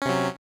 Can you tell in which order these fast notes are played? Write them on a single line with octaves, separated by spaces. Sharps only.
C#4 C3 F#3